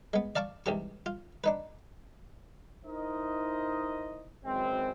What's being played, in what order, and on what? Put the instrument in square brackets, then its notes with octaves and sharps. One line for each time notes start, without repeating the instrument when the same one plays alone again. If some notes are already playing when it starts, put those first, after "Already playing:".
[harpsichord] G#3 B3
D5 F5 A5 C#6 D6
C2 G#2 E3 G4 C#6
F4
D4 D#4 B4
[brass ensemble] D#4 E4 A#4 C5 D#5
G#1 F#2 E3 G#3 C4